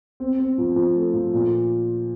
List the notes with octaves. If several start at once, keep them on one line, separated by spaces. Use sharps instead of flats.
C4
C4
F3
F3
A3
F3
A#2